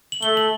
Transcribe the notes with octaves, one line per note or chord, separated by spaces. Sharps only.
F#7
A3 G7
F#7